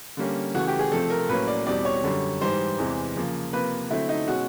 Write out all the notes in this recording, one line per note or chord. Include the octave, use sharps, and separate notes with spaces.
D3 G3 A#3 C#4
C#3 E3 A3 F#4
G4
G#4
C3 F3 A3 C4 A4
A#4
A2 F#3 A#3 C#4 B4
D5
E2 B2 G3 C4 D5
C#5
F#2 D3 G3
G#2 E3 G3 C5
E2 C3 E3 G#3
C#3 F3 A#3
C3 F3 A#3 B4
D3 F#3 A3 C4 E4
D#4
B2 G#3 C#4 F#4